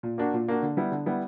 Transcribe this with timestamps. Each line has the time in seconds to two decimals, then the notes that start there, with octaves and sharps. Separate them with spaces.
0.03 A#2
0.18 A#3 D4 F#4
0.34 A#2
0.48 A#3 D4 F#4
0.62 D3
0.77 G3 B3 E4
0.92 D3
1.06 G3 B3 E4